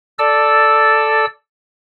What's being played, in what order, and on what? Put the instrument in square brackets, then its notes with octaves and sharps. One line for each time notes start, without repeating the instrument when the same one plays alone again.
[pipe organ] A4 D5 E6